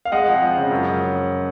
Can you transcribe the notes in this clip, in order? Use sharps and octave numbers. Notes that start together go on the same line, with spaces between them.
F5
G#3 D#5 F#5
F2
F3
C#3
F#2